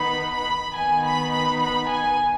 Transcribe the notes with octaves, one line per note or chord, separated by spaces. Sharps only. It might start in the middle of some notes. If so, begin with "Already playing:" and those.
Already playing: D#3 B3 D#4 B5
B5
D#3 B3 D#4 G#5
B5
B5
B5
G#5